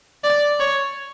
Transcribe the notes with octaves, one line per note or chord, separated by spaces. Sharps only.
D5
C#5